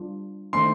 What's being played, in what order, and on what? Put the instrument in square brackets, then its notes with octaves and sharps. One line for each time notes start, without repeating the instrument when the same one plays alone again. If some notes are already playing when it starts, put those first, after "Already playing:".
Already playing: [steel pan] G3 D4 F4
[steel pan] D#3 A3 D4 [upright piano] C6